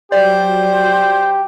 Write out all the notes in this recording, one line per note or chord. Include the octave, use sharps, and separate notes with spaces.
F#3 G4 C5 D5